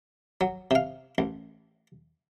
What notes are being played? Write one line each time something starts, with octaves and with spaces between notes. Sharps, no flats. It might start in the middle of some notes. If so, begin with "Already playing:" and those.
F#3
C3 F5
A1